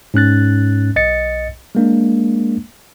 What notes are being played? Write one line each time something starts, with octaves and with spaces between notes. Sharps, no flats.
G#2 C#4 F#6 A6
B1 D#5 A6 C#7
G#3 A#3 D4